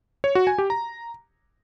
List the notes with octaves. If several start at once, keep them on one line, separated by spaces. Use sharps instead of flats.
C#5
F#4
G#5
G4
A#5